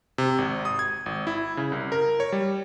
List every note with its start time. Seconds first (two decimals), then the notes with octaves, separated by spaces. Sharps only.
0.18 C3
0.38 G#1
0.65 D#6
0.79 G#6
1.06 G#1
1.27 E4
1.57 C#3
1.72 C2
1.92 A#4
2.20 C#5
2.32 G3